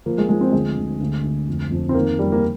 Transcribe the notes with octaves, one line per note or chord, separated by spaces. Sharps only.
F3 A#3
G#3
F3 G#3
C4
D2 G#3
D2
D2
D2
F2
F2
C4
D#3 A#3
F2 G3
A#3